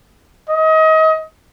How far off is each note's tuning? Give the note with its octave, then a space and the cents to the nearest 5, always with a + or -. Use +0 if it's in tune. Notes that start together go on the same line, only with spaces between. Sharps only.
D#5 +30